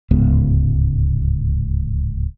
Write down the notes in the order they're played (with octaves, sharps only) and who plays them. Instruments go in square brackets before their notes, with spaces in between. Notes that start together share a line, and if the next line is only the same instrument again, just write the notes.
[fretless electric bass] D1 C#2 G#2 B3